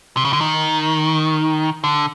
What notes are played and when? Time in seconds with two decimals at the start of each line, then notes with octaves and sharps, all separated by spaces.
0.17 C3
0.25 C#3
0.33 D3
0.41 D#3
1.84 D3